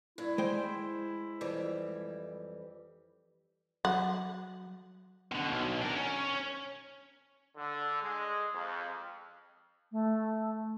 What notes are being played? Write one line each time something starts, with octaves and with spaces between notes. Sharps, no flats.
G2 E4
G#3 C5 G5
F2 E3 G3
F#3 F#5
B2 D3
B1
D4 A#4
C#4
D3
G#3
F2
A3